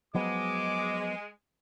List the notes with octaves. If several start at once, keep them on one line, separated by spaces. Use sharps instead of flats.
F3 F#3 G#3 B3 D6